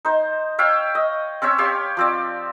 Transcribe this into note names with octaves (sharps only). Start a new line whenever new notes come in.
D#4 C5
C#5 E5 F5 G5
D#5
C4 C#4 C#5 E5
G4 C#5 F5 C6
F3 C4 D5